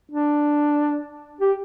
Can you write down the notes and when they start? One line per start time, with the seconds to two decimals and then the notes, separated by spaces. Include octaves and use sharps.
0.12 D4
1.41 G4